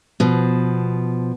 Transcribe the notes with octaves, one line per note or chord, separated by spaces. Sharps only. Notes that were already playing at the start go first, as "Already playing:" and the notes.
B2 F3